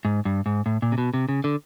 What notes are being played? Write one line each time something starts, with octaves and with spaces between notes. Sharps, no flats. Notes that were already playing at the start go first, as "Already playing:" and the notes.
G#2
G2
G#2
A2
A#2
C3
B2
C3
C#3
D3